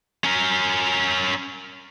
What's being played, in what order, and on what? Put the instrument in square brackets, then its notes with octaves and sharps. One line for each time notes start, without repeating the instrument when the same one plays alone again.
[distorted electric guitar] C#4 A#4